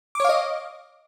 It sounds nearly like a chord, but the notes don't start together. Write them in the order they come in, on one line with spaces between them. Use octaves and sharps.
D6 C#5 F5 D#5